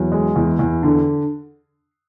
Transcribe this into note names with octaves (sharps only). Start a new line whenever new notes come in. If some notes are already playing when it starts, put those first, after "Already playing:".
Already playing: E2 F#3
G#3
E2
E2
D3